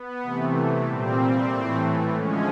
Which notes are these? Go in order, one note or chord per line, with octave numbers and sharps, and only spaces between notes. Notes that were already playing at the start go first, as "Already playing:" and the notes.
Already playing: B3
C3 E3 A3
A#2 G3 C4
A2 E3 A3
D3 F3 G#3 C#4